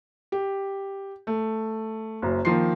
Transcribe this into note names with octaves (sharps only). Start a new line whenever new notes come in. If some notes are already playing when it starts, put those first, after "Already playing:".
G4
A3
F#1 F#2
D#3 F3 A#3 C6 C7